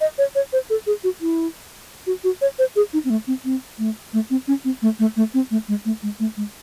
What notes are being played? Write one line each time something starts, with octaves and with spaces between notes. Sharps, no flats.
D#5
C#5
C#5
C5
A4
G#4
F#4
E4
F#4
F#4
C#5
C5
G#4
D#4
C4
A3
C4
C4
A3
A3
C4
C#4
C4
A3
A3
A3
C4
A3
G#3
A3
G#3
A3
G#3